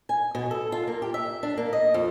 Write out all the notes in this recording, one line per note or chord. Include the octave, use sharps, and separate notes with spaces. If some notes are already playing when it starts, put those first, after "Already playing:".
G#5
B2
A4
F4
A#3
G4
E5
D4
A#3
D#5
F2